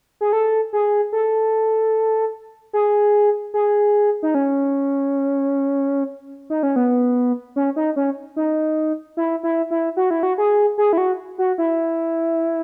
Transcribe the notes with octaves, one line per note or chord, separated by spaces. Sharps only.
G#4
A4
G#4
A4
G#4
G#4
D#4
C#4
D#4
C#4
B3
C#4
D#4
C#4
D#4
E4
E4
E4
F#4
E4
F#4
G#4
G#4
E4
F#4
F#4
E4